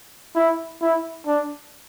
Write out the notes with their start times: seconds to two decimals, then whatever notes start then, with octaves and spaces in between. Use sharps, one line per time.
0.36 E4
0.81 E4
1.27 D4